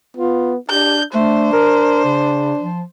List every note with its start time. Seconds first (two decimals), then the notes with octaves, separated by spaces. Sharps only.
0.17 B3 F4
0.70 D4 G4 G6
1.15 A3 D4 C5
1.52 A#4
2.04 C#3
2.59 F3